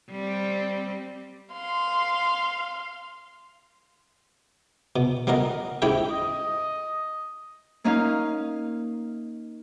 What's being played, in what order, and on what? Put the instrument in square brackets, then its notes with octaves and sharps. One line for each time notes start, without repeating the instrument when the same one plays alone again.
[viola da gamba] G3 C4
[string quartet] F5 C6
[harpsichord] B2
G3 B3 F#4 A#4 D#5
G#2 C#4 E4 G4 C#5 G5
[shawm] D#5
[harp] A#3 C#4 D#4 D#5 F5